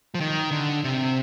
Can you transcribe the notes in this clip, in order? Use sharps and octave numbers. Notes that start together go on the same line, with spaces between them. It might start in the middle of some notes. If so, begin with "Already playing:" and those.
F3
D#3
D3
C3